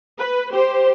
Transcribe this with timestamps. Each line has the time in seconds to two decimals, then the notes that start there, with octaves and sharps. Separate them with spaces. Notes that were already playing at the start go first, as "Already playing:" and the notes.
0.18 B4
0.53 G4 C5